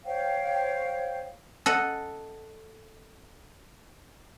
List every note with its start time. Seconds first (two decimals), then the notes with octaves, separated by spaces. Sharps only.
0.04 C5 C#5 F5 G5
1.66 A4 D#5 F#5